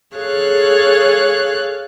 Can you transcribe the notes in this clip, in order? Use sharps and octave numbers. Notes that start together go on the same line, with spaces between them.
G#4 A4 C#5 F5 F#6